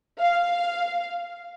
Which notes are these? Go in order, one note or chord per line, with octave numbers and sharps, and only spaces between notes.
F5